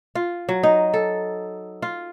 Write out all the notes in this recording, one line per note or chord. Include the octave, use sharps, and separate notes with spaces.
F4
F#3
D#4
A4
F4